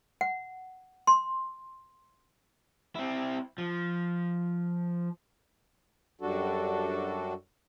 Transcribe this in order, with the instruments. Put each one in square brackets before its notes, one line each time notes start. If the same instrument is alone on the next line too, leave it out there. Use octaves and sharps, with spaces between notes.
[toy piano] F#5
C6
[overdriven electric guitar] C4 E4
F3
[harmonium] F#2 G3 D4 F#4 A4